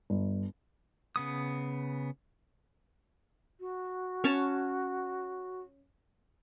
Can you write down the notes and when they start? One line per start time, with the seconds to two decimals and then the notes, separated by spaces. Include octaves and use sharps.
0.10 G1
1.16 C#3 B3 D#6
3.60 F#4
4.24 C#4 C#5 A5